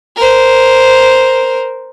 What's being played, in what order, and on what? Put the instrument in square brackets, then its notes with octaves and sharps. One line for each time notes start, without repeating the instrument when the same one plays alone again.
[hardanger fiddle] A#4 C5